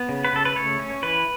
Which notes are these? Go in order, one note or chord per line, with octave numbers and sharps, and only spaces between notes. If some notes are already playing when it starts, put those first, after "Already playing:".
Already playing: B3
C#3
B4
C#3 A4
B4
A3 C#5
C#4
E3 B4